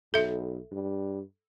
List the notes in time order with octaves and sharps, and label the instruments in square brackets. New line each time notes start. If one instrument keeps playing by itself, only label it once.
[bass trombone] B1 [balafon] A4 E5
[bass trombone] G2